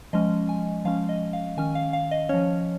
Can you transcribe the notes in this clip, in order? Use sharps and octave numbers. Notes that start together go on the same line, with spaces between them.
F3 G#3 C#4 D#5
G#5
F3 G#3 C#4 F5
D#5
F5
D#3 C#4 G#5
F5
F5
D#5
F3 C#4 C#5